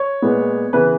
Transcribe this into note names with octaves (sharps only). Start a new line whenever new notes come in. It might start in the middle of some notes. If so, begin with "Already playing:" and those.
Already playing: C#5
A#2 G#3 B3
C#3 E3 B3 B4